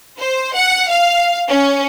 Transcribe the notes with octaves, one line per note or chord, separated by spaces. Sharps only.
C5
F#5
F5
C#4